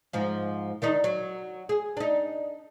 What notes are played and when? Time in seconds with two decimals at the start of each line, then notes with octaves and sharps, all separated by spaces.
0.13 G#2 F3
0.82 D#3 D4 D#4
1.04 F#3
1.69 G#4
1.97 D4 D#4